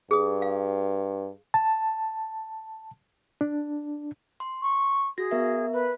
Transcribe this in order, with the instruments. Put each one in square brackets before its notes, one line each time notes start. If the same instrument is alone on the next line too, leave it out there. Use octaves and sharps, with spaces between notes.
[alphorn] G2 [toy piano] G#4 D#6
[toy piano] F5
[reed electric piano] A5
D4
[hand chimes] C6
[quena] C#6
[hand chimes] F#4 A#6 [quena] G#4
[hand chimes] B3 A#4 E5
[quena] B4